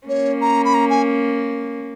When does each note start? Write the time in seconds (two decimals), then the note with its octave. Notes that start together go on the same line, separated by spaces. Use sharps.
0.09 A#3 C#4 C#5
0.42 A#5
0.65 B5
0.74 A#5
0.90 G#5